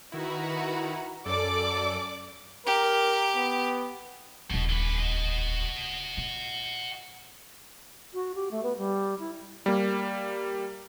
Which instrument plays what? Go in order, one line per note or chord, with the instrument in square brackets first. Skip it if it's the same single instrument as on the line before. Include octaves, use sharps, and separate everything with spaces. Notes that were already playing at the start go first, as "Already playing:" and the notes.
[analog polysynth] D#3 E4 [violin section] F#4 B4 A#5
[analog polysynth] F#2 A4 [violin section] D5 D6
[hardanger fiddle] G4 [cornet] A#4
[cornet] B3
[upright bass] D#1 C#2 [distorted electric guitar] B2
[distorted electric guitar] D3 B4
F#4 D#5
[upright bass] A#2
[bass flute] F#4
G4
A3
B3
G3
E4
[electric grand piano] G3 A#3